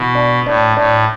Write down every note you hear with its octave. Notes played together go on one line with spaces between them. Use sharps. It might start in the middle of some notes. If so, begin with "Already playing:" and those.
Already playing: B2 E3
D4
A2 D4
A2 D4